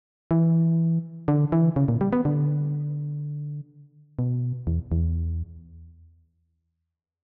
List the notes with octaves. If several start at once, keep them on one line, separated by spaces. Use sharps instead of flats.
E3
D3
E3
C#3
A#2
G3
B3
D3
B2
E2
E2